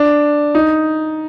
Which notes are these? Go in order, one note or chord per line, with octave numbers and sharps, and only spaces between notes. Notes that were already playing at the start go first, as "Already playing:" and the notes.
Already playing: D4
D#4